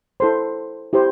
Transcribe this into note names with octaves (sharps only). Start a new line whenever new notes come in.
E4 A4 C5 C6
E4 G4 C5